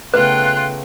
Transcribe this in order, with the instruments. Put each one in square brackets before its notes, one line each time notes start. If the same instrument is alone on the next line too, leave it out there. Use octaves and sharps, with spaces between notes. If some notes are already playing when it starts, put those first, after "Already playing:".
[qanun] C#3 A3 B3 [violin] F4 G5 [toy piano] B4 [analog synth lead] F#6